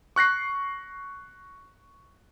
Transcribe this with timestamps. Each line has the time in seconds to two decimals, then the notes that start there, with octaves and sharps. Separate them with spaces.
0.16 C#6 F#6 A#6 C7